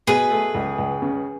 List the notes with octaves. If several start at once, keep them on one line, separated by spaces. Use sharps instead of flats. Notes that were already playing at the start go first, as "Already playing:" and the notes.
B2 G#4 B4
A3
C#2
C#2
C#3